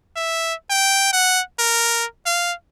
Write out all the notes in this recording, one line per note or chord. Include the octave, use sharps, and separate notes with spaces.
E5
G5
F#5
A#4
F5